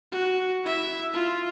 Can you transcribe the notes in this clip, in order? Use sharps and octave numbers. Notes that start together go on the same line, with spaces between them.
F#4
E4 E5
F4